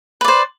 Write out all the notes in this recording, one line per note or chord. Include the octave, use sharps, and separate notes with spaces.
B4 C5 D5